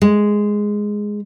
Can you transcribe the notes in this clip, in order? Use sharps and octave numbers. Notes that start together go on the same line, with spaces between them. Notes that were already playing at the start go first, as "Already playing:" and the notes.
G#3